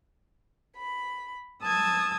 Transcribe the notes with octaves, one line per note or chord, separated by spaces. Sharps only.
B5
A5 D#6 E6 G#6